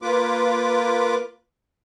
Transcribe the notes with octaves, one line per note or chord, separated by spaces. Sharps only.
A#3 F4 B4 D6